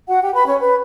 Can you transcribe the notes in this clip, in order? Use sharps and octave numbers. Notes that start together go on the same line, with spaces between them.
F#4 F#5
G4 G5
B4 B5
C#4 C#5
B4